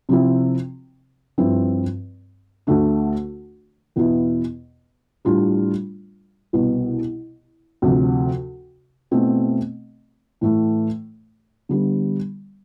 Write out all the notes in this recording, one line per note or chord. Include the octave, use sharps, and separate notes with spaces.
C3 F3 C4 E4
G2 F3 C4 E4
D2 D3 A3 D4
E2 B2 B3 E4
A2 G3 D4 F4
C2 B2 B3
D2 C3 F3
B2 A3 C4 E4
A2 E3 A3
D3 G3 B3